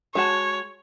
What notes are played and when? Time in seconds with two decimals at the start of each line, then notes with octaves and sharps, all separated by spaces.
0.15 G#3 F#4 C#5 A5